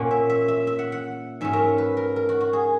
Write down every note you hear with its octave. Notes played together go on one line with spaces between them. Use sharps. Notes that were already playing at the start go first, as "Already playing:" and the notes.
Already playing: A#2 A#3 C#4 F#5
E5
E5
E5
E5
F#5
F#5
G#2 F#3 C#4 E5
A#4
B4
A#4
A#4
F#4
F#4
G#4